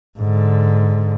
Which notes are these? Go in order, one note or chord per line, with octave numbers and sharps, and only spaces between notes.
G#2 D3